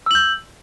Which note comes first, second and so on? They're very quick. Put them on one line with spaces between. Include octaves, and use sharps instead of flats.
E6 F#7 G6